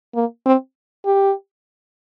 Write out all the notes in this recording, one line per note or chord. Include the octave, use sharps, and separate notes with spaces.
A#3
C4
G4